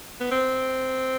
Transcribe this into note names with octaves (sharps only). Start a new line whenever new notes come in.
B3
C4